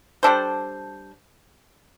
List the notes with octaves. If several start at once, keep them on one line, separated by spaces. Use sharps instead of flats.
G3 D4 A4 C5